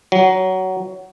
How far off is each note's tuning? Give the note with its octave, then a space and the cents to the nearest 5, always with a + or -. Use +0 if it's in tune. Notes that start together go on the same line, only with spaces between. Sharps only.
F#3 +15